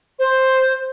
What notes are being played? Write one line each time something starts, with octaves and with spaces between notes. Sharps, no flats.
C5